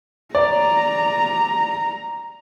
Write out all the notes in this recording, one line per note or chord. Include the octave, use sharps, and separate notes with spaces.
D5 A#5